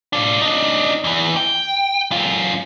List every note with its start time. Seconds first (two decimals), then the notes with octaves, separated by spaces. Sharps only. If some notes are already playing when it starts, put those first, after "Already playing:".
0.13 D4 F4
0.41 D4 D#4
1.04 E2 E3
1.37 G5
2.11 F#2 F4